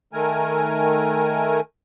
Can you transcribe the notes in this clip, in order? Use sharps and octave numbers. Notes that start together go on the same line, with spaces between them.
D#3 A3 A#4 G#5